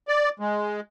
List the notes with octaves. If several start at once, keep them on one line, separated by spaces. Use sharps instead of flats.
D5
G#3